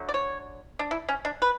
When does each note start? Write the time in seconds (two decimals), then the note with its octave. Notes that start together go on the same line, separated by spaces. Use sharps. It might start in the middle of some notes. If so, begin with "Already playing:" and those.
Already playing: D3 F#3 A3
0.09 D5
0.14 C#5
0.79 D4
0.91 E4
1.09 C#4
1.25 D4
1.42 B4